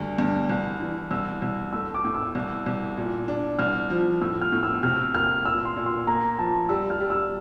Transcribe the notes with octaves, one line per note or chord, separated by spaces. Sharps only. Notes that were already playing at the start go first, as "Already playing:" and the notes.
Already playing: D2 G2
G2
C2
E3
C2 E6
C2
A3 E6
D6
A2
E6
C2
C2
A#2
D4
C2 F6
F3
A2 E6
F6
A2
E6
C3 F6
A#3 F6
A#2 E6
C6
A#2
C6
A#3 A#5
F3 A5
G3 E6
F6
G3
E6